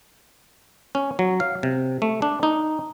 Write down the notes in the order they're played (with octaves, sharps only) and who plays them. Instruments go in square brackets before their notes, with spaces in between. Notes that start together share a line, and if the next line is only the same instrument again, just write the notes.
[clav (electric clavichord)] C#4
F#3
F5
C3
A3
D4
D#4